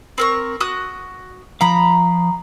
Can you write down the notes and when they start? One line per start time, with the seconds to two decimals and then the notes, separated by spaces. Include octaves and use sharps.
0.18 C4 A#4 C#6
0.60 F#4 D#6 F#6
1.61 F3 F5 A#5 B5